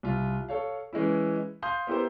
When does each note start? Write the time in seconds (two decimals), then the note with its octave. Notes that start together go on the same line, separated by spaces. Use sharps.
0.03 C2 F4
0.49 A4 C#5 F5
0.93 E3 G#3 C#4 E4
1.62 F5 C6 D#6 G6
1.87 B3 E4 G4 A#4 C5